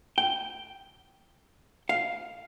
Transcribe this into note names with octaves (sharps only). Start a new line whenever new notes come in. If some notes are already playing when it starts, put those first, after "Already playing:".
G5
F5